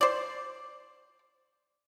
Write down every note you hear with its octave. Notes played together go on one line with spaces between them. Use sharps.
C5 D5